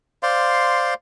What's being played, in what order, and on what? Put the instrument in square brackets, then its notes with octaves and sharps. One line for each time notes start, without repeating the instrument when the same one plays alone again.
[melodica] C5 D5 F5 C6